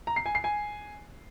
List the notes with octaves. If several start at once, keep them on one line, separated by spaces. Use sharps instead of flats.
A#5
C7
G#5
C7
G#5